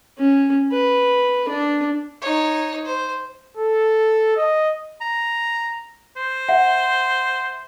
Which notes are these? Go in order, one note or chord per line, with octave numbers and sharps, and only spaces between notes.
C#4
B4
D4
D#4 C#5
C5
A4
D#5
A#5
C5
E5 F#5